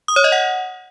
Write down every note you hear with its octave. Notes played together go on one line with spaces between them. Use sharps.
D#6
C#5
D#5
F#5